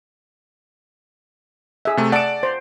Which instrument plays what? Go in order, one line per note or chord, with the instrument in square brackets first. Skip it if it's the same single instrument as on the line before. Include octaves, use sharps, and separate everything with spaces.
[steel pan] G#4 E5
[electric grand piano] C3 A3
[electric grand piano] D5 D7 [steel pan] F#5 A5
[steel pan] C5